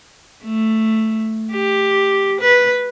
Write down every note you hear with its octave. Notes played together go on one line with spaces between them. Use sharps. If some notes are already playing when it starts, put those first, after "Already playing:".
A3
G4
B4